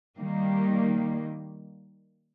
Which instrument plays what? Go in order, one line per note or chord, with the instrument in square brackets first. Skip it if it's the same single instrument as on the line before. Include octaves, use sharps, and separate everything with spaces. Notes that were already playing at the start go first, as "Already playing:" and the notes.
[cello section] D#3 G3 A#3